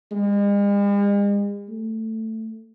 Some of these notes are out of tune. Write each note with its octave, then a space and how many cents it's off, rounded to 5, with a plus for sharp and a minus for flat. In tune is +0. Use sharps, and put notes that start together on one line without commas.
G#3 -45
A3 +10